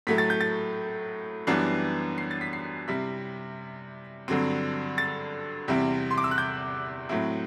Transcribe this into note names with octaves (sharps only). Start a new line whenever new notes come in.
A2 F#3 A3 B6
A6
G6
A6
F#2 E3 G3 B3 D4 C7
C7
A6
B6
C7
C3 G3 C4 E4 B6
G2 D3 F#3 C4
A6
E2 C3 G3 C4 E4
C6
D6
E6
F#6
G6
A2 F#3 C4 E4